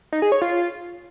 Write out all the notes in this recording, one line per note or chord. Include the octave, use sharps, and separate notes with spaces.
D#4
G#4
C#5
F4